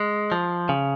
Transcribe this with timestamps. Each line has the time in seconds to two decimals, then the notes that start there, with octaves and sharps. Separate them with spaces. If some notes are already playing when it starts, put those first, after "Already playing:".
Already playing: G#3
0.32 F3
0.69 C#3